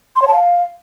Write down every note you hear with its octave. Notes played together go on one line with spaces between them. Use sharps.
C6
C#5
A5
F5